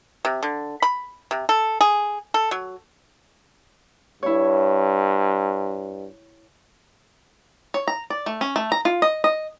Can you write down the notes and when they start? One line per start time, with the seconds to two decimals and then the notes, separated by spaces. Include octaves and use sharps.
0.25 C3
0.43 D3
0.82 B5
1.31 C3
1.49 A4
1.81 G#4
2.34 A4
2.51 F#3
4.23 G2 E4 C#5
7.74 C#5
7.88 A#5
8.10 D5
8.26 A3
8.41 C#4
8.56 A3
8.72 A#5
8.85 F4
9.02 D#5
9.24 D#5